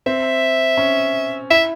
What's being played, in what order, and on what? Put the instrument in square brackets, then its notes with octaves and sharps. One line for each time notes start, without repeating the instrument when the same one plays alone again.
[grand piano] C4 [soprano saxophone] E5
[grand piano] C#4
[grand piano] E4 [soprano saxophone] E5